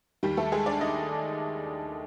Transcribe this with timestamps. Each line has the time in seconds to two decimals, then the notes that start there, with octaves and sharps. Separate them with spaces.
0.23 D#2 D#3 G3 G4
0.37 A3 A4
0.52 G#3 G#4
0.66 D4 D5
0.81 D#4 D#5